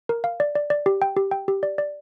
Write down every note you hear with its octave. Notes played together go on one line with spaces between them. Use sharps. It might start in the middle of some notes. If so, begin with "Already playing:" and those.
A#4
F5
D5
D5
D5
G4
G5
G4
G5
G4
D5
D5